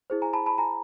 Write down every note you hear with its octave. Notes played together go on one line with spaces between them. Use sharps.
E4 G#4 C5
G#5 A#5
A5 B5
A5 B5
G#5 A#5